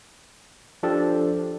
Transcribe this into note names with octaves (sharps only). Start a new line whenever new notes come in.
F3 D4 G4 A4 D5